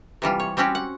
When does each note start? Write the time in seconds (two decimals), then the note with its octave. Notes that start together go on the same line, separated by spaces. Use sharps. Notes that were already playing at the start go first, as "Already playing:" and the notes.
0.22 C3 E3 G3 F4
0.40 C#5
0.57 G3 C4 C#4 F#4 G4
0.75 F#5